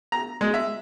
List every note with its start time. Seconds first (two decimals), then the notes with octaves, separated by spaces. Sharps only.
0.12 A#5
0.41 G#3
0.54 E5